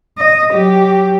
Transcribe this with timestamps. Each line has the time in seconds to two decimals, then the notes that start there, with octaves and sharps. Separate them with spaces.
0.18 D#5
0.52 F#3 G4